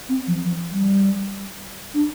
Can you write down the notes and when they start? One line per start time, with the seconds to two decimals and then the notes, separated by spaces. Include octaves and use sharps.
0.09 C4
0.27 F3
0.44 F3
0.71 G3
1.94 D4